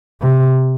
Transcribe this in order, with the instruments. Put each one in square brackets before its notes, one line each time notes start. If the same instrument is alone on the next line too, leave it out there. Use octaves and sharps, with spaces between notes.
[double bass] C3